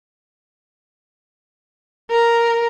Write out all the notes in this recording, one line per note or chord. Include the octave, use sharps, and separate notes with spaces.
A#4